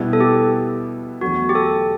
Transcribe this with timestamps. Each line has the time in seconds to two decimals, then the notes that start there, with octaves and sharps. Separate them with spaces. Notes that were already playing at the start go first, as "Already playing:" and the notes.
Already playing: B2 G3 B3 E4
0.13 A4
0.20 G4
1.21 E2 D3 F#3 A3 F#4
1.49 G4
1.55 A4